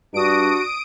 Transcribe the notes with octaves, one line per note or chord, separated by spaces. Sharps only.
G2 D4 F#4 D#6 D7